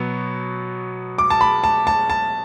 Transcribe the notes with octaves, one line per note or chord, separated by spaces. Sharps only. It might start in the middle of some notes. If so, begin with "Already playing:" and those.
Already playing: B2 F#3 B3
D6
A5
B5
A5
A5
A5